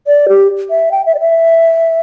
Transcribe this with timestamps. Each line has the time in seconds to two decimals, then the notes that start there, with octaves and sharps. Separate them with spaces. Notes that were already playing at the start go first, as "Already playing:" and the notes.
0.07 D5
0.29 G4
0.71 E5
0.92 G5
1.06 E5
1.15 D5
1.20 E5